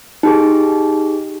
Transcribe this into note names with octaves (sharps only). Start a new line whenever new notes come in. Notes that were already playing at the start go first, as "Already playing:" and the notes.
D#4 G4 G#4